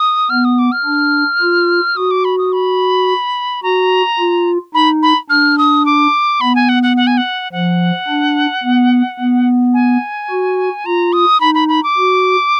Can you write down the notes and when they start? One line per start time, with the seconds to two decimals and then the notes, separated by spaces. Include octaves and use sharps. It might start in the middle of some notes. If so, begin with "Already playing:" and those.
Already playing: D#6
0.30 B3 F6
0.45 D#6
0.59 D6
0.72 F6
0.85 D4
1.41 F4
1.97 F#4 D#6
2.11 D6
2.25 B5
2.38 D#6
2.53 B5
3.63 F#4 A#5
4.19 F4
4.74 D#4 B5
5.03 B5
5.30 D4 F6
5.58 D#6
5.86 D6
6.41 B3 B5
6.55 G#5
6.69 F#5
6.83 F#5
6.97 F#5
7.07 G#5
7.18 F#5
7.52 F3 F#5
8.08 D4
8.63 B3
9.19 B3
9.74 G#5
10.30 F#4
10.86 F4 A#5
11.13 D#6
11.40 D#4 B5
11.55 B5
11.68 B5
11.83 D6
11.97 F#4